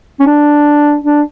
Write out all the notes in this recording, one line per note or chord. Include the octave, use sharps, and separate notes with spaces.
C#4
D4
D4